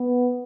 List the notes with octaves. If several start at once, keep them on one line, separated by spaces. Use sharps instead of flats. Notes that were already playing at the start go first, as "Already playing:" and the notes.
Already playing: B3